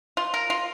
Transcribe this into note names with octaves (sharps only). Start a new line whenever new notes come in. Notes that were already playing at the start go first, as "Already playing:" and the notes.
F4
A#4
F4